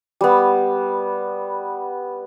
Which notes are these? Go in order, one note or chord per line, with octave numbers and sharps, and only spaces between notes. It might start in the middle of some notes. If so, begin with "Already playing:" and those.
G3 B3